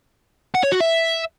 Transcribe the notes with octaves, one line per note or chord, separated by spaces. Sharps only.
F#5
C#5
F#4
E5